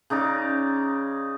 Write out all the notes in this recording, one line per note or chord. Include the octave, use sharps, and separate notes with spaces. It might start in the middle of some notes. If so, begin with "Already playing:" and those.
C#3 D#4 D5 A#5